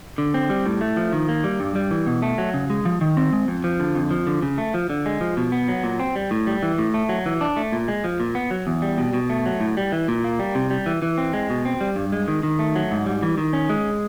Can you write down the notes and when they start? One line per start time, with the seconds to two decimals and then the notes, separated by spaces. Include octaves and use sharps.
0.18 D3
0.34 C4
0.50 G3
0.66 A2
0.81 A3
0.97 F3
1.13 D#3
1.29 A#3
1.44 G3
1.60 G2
1.75 G3
1.91 E3
2.07 B2
2.22 A3
2.38 F#3
2.54 C#3
2.70 G#3
2.85 F3
3.01 D#3
3.17 C4
3.33 G#3
3.48 F2
3.64 F3
3.80 D3
3.95 F2
4.11 F3
4.27 D3
4.42 C#3
4.58 A3
4.74 F3
4.90 D3
5.06 G#3
5.21 F3
5.37 B2
5.52 B3
5.68 F#3
5.84 A#2
6.00 C4
6.16 G3
6.31 A2
6.47 G3
6.63 E3
6.78 A2
6.94 A3
7.09 F#3
7.26 E3
7.41 D4
7.57 A3
7.72 A#2
7.88 G#3
8.04 F3
8.20 A#2
8.35 B3
8.51 F#3
8.67 E2
8.82 G3
8.98 B2
9.13 B2
9.30 A3
9.46 F#3
9.61 A2
9.77 G3
9.92 E3
10.08 A#2
10.24 A#3
10.39 G3
10.55 C3
10.70 G3
10.86 E3
11.02 E3
11.18 C4
11.33 G#3
11.50 B2
11.65 C4
11.81 G3
11.96 G2
12.12 G#3
12.28 D#3
12.43 D#3
12.59 A3
12.75 F#3
12.91 G#2
13.07 G3
13.23 E3
13.38 D#3
13.53 C#4
13.70 G#3